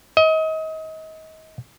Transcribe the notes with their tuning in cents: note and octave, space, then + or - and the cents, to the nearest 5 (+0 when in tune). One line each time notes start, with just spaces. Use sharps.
D#5 +30